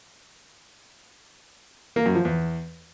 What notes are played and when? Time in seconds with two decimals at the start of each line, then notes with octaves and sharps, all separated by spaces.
1.96 A#3
2.06 F#2
2.15 F3
2.25 E2